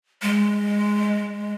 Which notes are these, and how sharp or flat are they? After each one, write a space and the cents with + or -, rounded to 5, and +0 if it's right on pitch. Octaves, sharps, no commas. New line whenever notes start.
G#3 -10